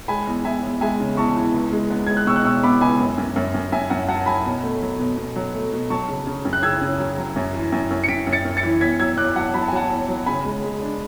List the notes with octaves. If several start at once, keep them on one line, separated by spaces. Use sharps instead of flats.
G#3 G#5 B5
E2
E2 E5 G#5
E2
G#3 E5 G#5
C#3
E2 A5 C#6
E3
C#2
G#3
B3
G#3 G#6
F#6
B2 C#6 E6
F#6
B2 C#6 E6
B3 B5 D6
C#2 G#5 B5
F#2
F#2
F#2
F#2
F#2 E5 G#5
F#2 F#5
F#3 F#5 A5
A5
F#3 G#5 B5
B2
A3
F#3
B2
B2
F#3
A3
B2
F#3 A5 C#6
C#3
C#3
F#2
F#6
C#3 E6 G#6
C#3
F#3
F#3
F#2
E3
F#2
F#2
C#7
F#2 B6 D7
F#2
A6 C#7
F#2
A6 C#7
E3
E2 G#6 B6
F#3 E6 G#6
E2 D6 F#6
F#3 F#5 A5
F#3 B5
A5
G#5
F#3 F#5 A5
E2
F#3
C#3 G#5 B5
G#3
G#3
D4